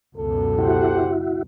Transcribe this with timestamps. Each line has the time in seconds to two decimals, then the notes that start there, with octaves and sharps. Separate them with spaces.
0.17 C#2 F#2 B2 A4
0.58 E4 F#4 G4 C5 F#5